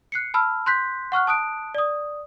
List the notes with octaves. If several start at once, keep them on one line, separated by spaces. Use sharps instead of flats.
F#6 C7 C#7
A5 B5 E6 F6
C6 F#6 G6 B6
F#5 C#6 F6 F#6
A5 D#6 F#6 D7
D5 D#6